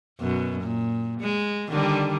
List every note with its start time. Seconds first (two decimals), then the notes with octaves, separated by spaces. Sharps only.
0.20 F#2 B2
0.61 A#2
1.20 G#3
1.70 D3 D#3 G3